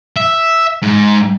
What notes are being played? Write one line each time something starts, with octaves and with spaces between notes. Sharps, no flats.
E5
G#2